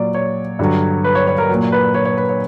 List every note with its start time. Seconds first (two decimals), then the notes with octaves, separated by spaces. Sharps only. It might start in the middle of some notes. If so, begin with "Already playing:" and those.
Already playing: A#2 F#3 D5
0.14 C#5
0.59 G2 D3 F#3
1.04 B4
1.15 C#5
1.27 C#5
1.38 A#4
1.49 A#2 F#3
1.72 B4
1.95 C#5
2.05 C#5
2.17 B4
2.29 C#5